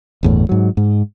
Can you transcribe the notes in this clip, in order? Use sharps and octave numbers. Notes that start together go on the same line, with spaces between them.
G1 E2 A2
G#2 F#3
G#2